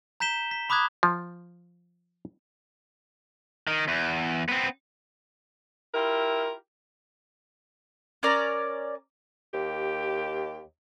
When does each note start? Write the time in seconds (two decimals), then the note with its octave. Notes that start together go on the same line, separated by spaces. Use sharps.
0.20 A#5 G6 B6 E7 G7
0.51 B6
0.69 A#5 B5 D6 D#6 F#6 G#6
1.03 F3
3.67 D#3
3.88 E2
4.48 B3 C4
5.94 E4 F4 G4 A#4
8.23 C#4 A#4 D5 A#5
9.54 D#2 G4